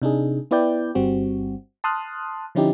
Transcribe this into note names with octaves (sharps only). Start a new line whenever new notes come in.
C3 D4 D#4 G#4
B3 E4 B4 D5 G5 G6
G1 G3 C4 F#4
A5 C6 D#6 F6 F#6
D3 F3 C#4 D#4 E4 G4